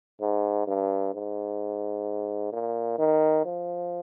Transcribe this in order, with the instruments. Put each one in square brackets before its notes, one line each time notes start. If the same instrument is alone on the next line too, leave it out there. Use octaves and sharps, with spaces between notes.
[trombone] G#2
G2
G#2
A#2
D#3
F3